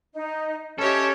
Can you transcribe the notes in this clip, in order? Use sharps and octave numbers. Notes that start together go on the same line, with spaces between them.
D#4 D#5
C#4 G4 A4 C#5 D#5 E5